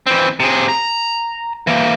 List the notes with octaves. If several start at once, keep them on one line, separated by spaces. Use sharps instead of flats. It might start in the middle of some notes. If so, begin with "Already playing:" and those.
E3 C4
C3 G#4
A#5
E3 A#3